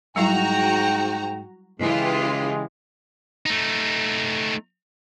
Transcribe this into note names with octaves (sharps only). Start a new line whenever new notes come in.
G#2 F#3 G3 E4 F#4 G5 A#5
C#3 E3 G#3 F4 G4
A3 D#4